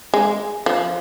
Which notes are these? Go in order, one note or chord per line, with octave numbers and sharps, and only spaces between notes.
G#3
F3